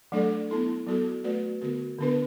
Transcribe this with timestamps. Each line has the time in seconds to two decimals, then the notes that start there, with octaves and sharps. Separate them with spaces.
0.12 F#3 A3 D4 A4 D5
0.50 B3 E4 A4
0.87 F#3 B3 F#4 A4
1.24 A3 F#4 B4 D5
1.61 D3 B3 F#4
1.99 D3 B3 D4 B4